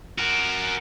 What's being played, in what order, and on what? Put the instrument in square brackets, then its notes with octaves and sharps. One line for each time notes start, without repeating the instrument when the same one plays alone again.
[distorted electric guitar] F#4 A#4